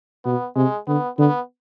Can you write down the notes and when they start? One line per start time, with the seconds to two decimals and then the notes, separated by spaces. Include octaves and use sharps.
0.25 B2 B3
0.55 C3 G#3
0.87 D3 B3
1.18 D3 B3